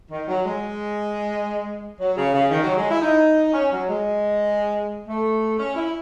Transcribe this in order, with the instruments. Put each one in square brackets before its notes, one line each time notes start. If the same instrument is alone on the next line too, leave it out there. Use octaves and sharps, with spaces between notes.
[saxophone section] D#3
F#3
G#3
F#3
C#3
C#3
D#3
F#3
G#3
E4
D#4
C#4
F#3
G#3
A3
C#4
E4